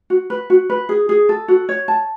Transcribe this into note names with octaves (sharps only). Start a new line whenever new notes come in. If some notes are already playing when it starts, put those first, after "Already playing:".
F#4
B4
F#4
B4
G#4
G#4
A4
F#4
C#5
A5